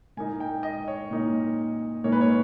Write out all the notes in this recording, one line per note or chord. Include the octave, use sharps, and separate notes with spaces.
A#2 A#3 D#4 G#5
G5
D#5
C#5
A#2 A#3 D#4
A#2 A#3 D#4 C#5
B4
C#5